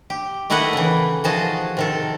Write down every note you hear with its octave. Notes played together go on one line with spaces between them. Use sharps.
G4
D#3 A3 E4 B4 D#5 F#5
C#3 E3
D#3 F3 F#4 G#4 D#5 A5
C3 D#3 A4